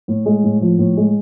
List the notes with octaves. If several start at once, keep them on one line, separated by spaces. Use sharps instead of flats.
A2
G#3
A2
F3
A2
G#3